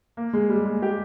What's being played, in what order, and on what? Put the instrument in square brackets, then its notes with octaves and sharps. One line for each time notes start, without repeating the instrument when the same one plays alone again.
[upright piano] A#3
G#3
G3
G#3
G4